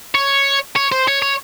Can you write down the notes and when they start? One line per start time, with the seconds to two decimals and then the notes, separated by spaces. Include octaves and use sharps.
0.15 C#5
0.76 C#5
0.92 C5
1.08 C#5
1.22 C#5